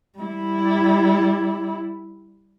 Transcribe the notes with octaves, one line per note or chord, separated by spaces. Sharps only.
G3 E4